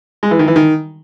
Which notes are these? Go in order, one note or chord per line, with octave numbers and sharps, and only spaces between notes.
G#3
E3
D#3
E3
D#3